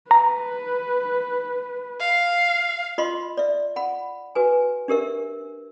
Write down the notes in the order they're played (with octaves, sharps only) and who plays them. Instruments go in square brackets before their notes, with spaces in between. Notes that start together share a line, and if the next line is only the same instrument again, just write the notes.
[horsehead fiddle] B4 [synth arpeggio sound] A#5
[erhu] F5
[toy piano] F4 D#5 B5 C6
D5 E5
F#5 B5
F#4 B4 G#5
D4 G4 A#4 E5